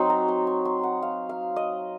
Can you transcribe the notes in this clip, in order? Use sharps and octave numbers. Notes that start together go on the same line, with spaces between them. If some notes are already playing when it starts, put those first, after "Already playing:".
Already playing: F#3 C4 D#4 C6
A#5
C6
C#6
C6
F#5
F5
F5
D#5